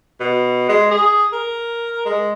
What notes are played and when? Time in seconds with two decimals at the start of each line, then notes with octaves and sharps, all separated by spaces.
0.20 B2
0.69 G#3
0.91 G#4
1.33 A#4
2.06 G#3